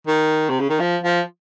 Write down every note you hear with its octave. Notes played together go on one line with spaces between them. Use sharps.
D#3
C3
C#3
D#3
F3
F3